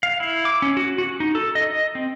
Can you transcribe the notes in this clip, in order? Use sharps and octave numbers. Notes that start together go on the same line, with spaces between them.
F5
E4
D6
C#4
F#4
F#4
D#4
A4
D#5
D#5
C4